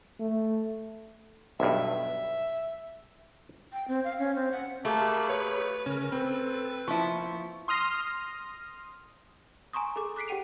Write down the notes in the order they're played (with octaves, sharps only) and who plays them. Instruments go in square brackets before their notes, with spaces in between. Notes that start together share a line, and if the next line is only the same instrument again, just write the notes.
[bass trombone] A3
[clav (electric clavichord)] B1 G2 [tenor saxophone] E5
[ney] G5
C4
F5
C#4
C4
F#5
[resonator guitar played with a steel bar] A3 [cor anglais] A#3 [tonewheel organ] G4 G#4 B5
[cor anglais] B4 [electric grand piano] C#5
[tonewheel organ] C#3 A#4 [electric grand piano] C#4
[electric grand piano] C4 [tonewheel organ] A4 [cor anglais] B4
[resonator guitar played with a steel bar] F3 E4 [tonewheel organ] A#3 [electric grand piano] C#6
[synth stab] C6 D#6 F6 A#6
[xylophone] G#5 A#5 C6 C#6 D#6
G#4 A4 D6
D6 F#6 B6 C7 D7
G4 F#5 G5 D#7 F7